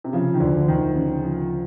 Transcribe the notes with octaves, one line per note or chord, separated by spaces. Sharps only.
C3
C#3 F3
D#3
D2 D3
D2 D#3
C#3
F3